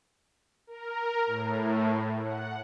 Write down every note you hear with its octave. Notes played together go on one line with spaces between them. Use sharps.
A#4
A2
F#5